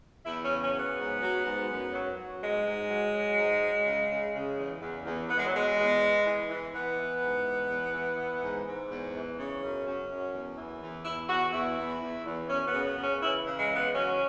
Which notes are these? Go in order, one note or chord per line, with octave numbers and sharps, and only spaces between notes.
E2 E4
C#4
C#3
C#4
F#3
B3
G#2
F#3
G#2
F#2
F#3
F#3
G#2 G#3
G#2
F#3
F#3
G#2
F#3
C#3
C#3
C#3
E2
E2
E2
E2 B3
G#3
F#3
B2 G#3
E2
E3
E3
E3
E3 B3
E3
G#2
E3
E2
E3
E3
G#2
G#2
E2
E3
C#3
F#2 C#4
F#2
F#2
E2
E3
E2
E2 E4
E2 F#4
E2 E4
E2
E2
E2
F#2 C#4
B3
C#3
B3
C#3
C#4
E3 E4
C#3
G#3
E3
B3
F#3 C#4